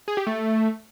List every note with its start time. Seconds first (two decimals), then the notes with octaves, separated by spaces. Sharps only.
0.08 G#4
0.17 G4
0.27 A3